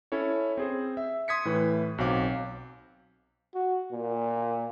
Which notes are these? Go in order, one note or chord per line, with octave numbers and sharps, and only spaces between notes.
C#4 E4 A4 C#5
C4 G#4 C5
E5
C6 D#6 G#6 B6 C#7
A2 E3 B4
B1 F#3 C4 F5 D6
F#4
A#2